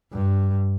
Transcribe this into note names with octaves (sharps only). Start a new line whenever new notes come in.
G2